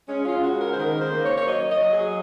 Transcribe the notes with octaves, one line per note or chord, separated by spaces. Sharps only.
G#3 C#4
F4
C#3 F#4
A#4
C5
D#3 A#4
C5
A#3
C#5
C#5
F#3 D#5
D#5
F#3
G#4